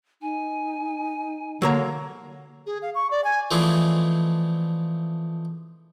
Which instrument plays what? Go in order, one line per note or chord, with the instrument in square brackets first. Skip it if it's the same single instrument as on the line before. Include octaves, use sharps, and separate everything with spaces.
[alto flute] D#4 [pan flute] G#5
[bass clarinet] D3 [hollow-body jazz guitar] F#3 A#3 A#5 [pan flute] C#5
[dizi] G#4
F5
C#6
D5
G#5
[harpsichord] E3 F3 G#3 A3 C4 D4